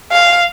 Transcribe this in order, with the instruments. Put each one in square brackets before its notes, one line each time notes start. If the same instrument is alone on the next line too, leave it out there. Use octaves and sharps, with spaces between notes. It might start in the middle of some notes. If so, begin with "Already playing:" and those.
[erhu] F5